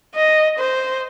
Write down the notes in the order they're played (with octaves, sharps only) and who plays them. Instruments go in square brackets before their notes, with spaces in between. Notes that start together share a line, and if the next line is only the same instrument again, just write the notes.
[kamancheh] D#5
C5